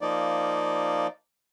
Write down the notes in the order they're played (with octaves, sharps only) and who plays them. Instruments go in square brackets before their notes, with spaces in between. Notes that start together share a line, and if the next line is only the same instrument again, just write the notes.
[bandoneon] F3 A#3 D#4 D5